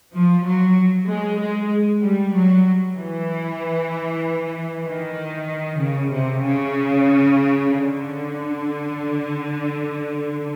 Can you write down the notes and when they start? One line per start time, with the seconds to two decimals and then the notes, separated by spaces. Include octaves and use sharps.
0.13 F3
0.46 F#3
1.08 G#3
1.39 G#3
2.02 G3
2.33 F#3
2.96 E3
4.84 D#3
5.78 C#3
6.10 C3
6.42 C#3
7.67 D3